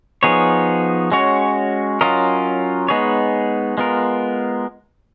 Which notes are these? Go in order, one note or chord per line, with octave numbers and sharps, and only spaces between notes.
F3 B3 D#4 G#4 C#5
G#3 C#4 F#4 C#5
F#3 C#4 F4 A#4 D#5
G#3 B3 D#4 G#4 C#5
G#3 B3 F4 A#4